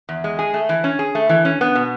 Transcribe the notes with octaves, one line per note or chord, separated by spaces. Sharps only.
E2
G#3
G#4
A3
E3
C#4
G#4
A3
E3
C#4
B3
B2